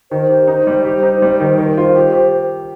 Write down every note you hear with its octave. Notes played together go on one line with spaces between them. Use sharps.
D#3 C5
G4
D#4
G3
G4
D#4
G3 C5
D#3
A#4
D#3 C5
F4
G4
G4